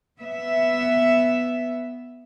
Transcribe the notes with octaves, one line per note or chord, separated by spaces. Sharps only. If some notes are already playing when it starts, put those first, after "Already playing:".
B3 E5